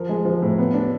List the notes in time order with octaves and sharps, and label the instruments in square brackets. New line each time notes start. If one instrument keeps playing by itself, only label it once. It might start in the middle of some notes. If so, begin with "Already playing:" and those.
Already playing: [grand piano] F3 A#4
G#3
F3
A2
B3
D4